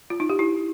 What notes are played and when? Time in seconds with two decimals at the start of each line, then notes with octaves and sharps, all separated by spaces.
0.10 F4
0.20 D#4
0.29 G4
0.39 E4